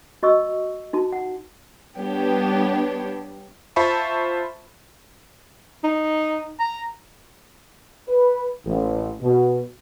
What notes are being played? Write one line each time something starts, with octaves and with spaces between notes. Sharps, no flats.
F#4 D#5 C#6 E6
D#4 F#4 A5
F#5
G3 B3 D4 G4 C#5
F4 C5 E5 A5 B5 C#6
D#4
A#5
B4
A1
B2